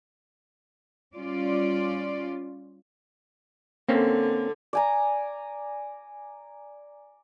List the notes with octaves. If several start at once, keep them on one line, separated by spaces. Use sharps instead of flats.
G3 C#4 F4 D5
D3 A#3 C4 C#4
D5 G#5 A#5